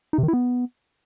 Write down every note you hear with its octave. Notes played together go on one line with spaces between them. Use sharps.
D#4
C3
D#3
E4
B3